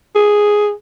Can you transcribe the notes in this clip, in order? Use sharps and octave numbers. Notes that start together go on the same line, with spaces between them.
G#4